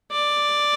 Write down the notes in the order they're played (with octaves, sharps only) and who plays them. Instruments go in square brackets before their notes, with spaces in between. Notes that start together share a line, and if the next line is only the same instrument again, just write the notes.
[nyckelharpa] D5